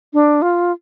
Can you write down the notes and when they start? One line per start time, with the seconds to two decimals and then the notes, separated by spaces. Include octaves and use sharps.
0.13 D4
0.42 F4